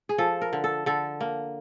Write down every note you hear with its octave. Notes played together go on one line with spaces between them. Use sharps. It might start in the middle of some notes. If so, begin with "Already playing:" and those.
G#4
F3 A4
A#4
D3
A4
D3 A4
A#3